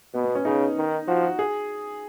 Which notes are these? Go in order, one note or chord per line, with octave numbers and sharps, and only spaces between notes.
B2 B3
B3
C#4
C#3 D#4
D#3
F3 F#4
F#4
G#4